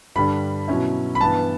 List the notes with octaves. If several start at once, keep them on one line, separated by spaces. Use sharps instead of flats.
G2 D3 G3 D4 B5
B2 F#3 C#4 E4
B5
G2 E3 B3 A5